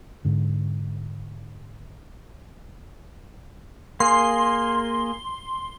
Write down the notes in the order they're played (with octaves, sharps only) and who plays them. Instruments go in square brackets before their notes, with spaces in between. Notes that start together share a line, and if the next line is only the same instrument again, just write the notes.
[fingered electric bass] G#2 D3
[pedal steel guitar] A#3 G#4 [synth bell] C6